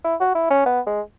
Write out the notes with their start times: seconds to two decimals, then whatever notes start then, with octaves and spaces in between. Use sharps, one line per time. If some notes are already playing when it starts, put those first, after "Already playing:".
0.04 E4
0.20 F#4
0.35 E4
0.50 C#4
0.66 B3
0.87 G#3